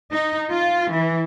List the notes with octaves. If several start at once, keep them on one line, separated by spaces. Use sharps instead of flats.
D#4
F4
E3